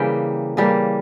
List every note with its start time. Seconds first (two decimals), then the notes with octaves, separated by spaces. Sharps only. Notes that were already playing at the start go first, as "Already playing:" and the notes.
Already playing: C#3 E3 G3 A#3 G5
0.57 C#3 E3 G3 A#3